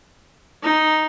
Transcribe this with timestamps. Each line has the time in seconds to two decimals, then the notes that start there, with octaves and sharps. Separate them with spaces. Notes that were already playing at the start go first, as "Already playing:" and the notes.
0.63 D#4